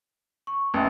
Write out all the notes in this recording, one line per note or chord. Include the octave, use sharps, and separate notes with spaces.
C#6
A1 E5 G5 A5